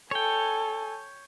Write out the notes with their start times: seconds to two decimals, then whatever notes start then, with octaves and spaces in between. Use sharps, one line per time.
0.11 A4 C#5 G5 G#5